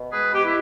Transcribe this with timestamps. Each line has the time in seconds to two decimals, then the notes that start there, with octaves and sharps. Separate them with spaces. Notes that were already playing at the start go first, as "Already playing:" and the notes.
Already playing: B2
0.10 G#3 G#4 B4
0.33 B2 G4
0.43 E4